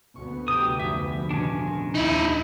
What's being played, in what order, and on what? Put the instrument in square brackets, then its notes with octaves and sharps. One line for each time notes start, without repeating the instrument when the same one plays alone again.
[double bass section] D2 B3 [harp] C#6
[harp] C3 F#3 [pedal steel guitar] G4 D#6
[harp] F1 G#4 D#7 [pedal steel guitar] E5
[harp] A#2 D#3 [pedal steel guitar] C#4 D4
[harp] A#4 C5
[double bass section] D#2 [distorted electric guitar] D#4 E4